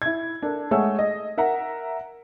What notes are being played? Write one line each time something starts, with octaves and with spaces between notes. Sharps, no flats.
E4 G#6
D4 A4 A#4
G#3 A3 G#4 C#5 F#5 E6
D#5
A#4 E5 F#5 A#5